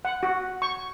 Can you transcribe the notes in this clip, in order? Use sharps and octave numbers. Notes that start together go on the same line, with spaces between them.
F#5
F#4
C#6